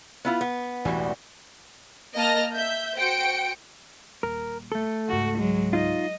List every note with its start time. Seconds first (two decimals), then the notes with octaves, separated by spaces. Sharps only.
0.25 B3 E4 F4
0.41 B3
0.85 E1 A1 E3 G3 F#4
2.15 A#3 D#5 A5 A#5 F6 A#6
2.54 E5 G6
2.97 F#4 C5 G5 C#7 D7
4.23 D#1 A#4
4.72 A3 A4
5.09 C#2 G#2 F#4
5.38 F#3 G#3
5.73 D#4 F4 D#5